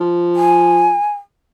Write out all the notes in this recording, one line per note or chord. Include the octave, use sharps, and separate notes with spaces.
F3
G#5